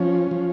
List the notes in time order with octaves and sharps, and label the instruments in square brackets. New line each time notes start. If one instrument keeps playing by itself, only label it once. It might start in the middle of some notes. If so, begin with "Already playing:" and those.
Already playing: [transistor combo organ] F3 C#4
F3